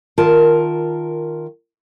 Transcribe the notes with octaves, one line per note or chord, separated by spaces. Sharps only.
D#3 F4 A#4 A5